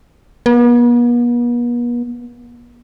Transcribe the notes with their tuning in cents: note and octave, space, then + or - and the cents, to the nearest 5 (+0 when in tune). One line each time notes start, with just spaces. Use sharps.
B3 -45